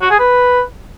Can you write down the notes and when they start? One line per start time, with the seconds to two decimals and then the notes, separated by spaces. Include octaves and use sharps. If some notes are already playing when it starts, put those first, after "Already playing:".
0.01 F#4
0.10 G#4
0.19 B4